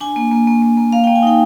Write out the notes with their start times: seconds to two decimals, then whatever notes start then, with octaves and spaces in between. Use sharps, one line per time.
0.01 D4 G#5
0.16 A#3
0.31 A#3
0.47 A#3
0.62 A#3
0.77 A#3
0.92 A#3 F5
1.04 G5
1.07 A#3
1.16 G#5
1.23 D#4 G5